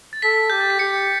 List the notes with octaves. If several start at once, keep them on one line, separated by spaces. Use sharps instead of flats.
A6
A4 B6
G4 G6
A6
B6
G4 C#7